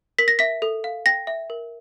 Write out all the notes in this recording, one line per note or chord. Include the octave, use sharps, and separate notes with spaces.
A#4 B6
A#6
E5 B6
A4
F5
G5 A#6
E5
A#4